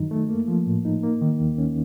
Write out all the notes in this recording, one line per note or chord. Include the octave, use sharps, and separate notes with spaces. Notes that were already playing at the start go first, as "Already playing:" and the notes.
Already playing: F#2 D#3 F#3 D#4
A3
A#3
F3
A2
D#4
A#3
D#3
D#2
C#4